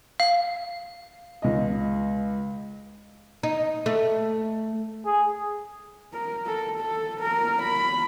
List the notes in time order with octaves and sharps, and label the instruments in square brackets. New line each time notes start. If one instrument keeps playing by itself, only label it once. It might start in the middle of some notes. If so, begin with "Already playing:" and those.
[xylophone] F5
[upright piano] C#2 D#5
[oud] D#4
A3
[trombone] G#4
[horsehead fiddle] A#4
A4
A4
A#4
B5